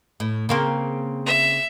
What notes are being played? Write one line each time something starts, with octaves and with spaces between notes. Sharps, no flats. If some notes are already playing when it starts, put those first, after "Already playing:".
A2
C#3 A#3 C4
E5